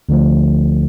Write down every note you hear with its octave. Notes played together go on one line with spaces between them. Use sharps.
D2 D3 F3 A3